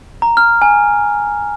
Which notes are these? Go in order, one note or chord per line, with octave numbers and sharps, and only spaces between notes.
A#5
F6
G#5